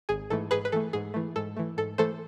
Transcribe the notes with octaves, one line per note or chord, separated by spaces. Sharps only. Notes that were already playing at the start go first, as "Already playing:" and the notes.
G#1 G#4
G#2 E3 A3 A4
G#2 G#4 B4
B4
E3 A3 A4
G#2 G#4
E3 A3
G#2 A4
E3 A3
G#2 A4
E3 A3 A4 C5